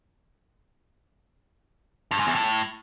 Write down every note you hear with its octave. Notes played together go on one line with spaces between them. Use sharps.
G2
G#2
E2
A2